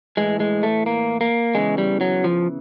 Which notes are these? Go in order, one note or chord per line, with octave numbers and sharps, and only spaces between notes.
A2 E3 G#3
G#3
A3
A#3
A#3
E2 C#3 E3 G#3
G3
F#3
F3